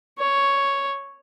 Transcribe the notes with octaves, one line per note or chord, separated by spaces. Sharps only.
C#5